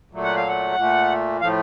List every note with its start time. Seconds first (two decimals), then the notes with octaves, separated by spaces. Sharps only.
0.12 A#2 F#3 A3
0.24 F#5
0.36 F5
0.48 F#5
0.76 A#2 A3
1.41 A2 F3 A3 F5